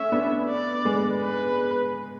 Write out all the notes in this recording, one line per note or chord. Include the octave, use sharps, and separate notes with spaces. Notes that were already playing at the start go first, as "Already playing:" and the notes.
Already playing: A3 C#4 E5
B3 D4
D5
G#3 B3
B4